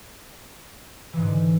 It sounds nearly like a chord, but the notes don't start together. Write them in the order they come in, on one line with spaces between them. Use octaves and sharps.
E3 G#2 D3